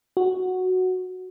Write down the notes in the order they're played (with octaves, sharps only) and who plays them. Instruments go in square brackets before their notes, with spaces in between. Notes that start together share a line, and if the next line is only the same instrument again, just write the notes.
[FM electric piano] F#4